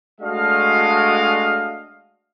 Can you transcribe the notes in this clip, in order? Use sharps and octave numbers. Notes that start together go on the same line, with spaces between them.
G#3 A3 D4 F#4 D#5 F5